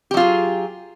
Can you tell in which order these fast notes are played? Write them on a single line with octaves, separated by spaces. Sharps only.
G4 F#3 F4 G#4